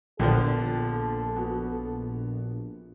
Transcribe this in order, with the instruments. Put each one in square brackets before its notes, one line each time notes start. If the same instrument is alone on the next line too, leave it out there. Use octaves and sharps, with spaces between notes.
[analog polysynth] A#1 [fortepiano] D3 F3 [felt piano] B3 D5 G5 [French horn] A4
[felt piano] B3 F#4